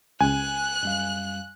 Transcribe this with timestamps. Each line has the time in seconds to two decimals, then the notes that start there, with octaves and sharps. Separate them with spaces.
0.20 C#2 G#5 F#6
0.83 F#2 G3 F5